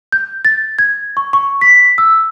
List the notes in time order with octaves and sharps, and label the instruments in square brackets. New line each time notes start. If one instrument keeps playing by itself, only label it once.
[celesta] G6
A6
G#6
C#6
C#6
B6
E6